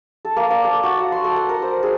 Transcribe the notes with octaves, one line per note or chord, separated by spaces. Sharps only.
A4
A#3
D5
A4
F#4
F#5
C6
A4
F#5
A#4
C5
G#4